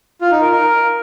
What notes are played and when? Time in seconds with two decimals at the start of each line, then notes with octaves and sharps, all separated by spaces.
0.21 F4
0.31 D#4
0.41 A#4
0.52 A#4